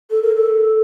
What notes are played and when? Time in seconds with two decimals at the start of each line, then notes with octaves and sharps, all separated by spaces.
0.11 A4
0.23 A#4
0.36 A4